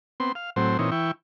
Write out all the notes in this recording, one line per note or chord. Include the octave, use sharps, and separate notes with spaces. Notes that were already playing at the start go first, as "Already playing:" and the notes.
B3 C4 C6
F5
A2 F#3 C4 C5
A#2 E3 C4 D#4 C#5
E3 E4 G5 C#6